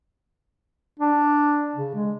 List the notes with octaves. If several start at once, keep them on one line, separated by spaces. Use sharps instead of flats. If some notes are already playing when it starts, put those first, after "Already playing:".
D4
C#3
G#3